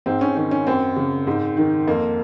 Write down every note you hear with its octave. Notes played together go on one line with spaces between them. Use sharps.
G#2 C4
C#4
D#3 C#4
C#4
F#2 C4
C#3
G#2
D#3
F2 A#3